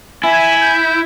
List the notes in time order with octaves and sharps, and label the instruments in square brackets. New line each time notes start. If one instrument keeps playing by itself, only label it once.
[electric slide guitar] E4 [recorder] E5 [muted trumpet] G#5
[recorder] G6